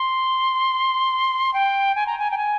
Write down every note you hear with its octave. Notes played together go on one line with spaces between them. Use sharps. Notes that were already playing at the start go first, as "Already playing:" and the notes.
Already playing: C6
G5
G#5
A#5
G#5
G5
G#5